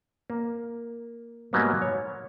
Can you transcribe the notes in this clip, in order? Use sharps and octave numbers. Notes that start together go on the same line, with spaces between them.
A#3
G#2 F#3 G3 A#3 B3
C#5